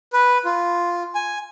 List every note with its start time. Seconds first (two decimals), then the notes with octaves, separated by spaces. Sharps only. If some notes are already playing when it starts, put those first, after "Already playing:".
0.13 B4
0.45 F4
1.15 G#5